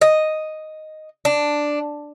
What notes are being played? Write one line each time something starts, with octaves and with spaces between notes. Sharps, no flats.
D#5
D4